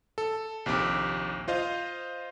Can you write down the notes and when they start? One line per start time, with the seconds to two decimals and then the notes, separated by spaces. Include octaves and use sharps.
0.18 A4
0.66 A#1 D#2 C3 D6
1.48 F4 C5 D#5 F5